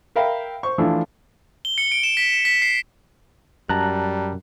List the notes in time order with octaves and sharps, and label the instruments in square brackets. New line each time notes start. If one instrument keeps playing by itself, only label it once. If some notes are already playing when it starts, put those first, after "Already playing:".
[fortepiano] A#4 E5 F5 G5 B5
C5 C#6
E3 F3 A3 D4 F4
[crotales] G7
C#7
D7
E7
B6
E7
B6
C7
[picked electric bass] F#2 [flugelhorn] G3 [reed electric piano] A5 A#5 F#6